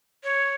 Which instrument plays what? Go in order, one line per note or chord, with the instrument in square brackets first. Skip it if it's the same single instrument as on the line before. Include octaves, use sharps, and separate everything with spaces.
[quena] C#5